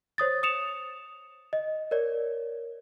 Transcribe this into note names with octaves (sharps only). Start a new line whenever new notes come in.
C5 C#5 D#6 A6
D#6 C#7 E7 F7
D#5
A#4 C#5 D5